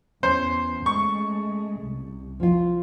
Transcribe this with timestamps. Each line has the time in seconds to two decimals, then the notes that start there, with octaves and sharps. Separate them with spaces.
0.23 E2 C#4 C5
0.86 G#3 A3 C#6
1.81 C2
2.40 F3 F4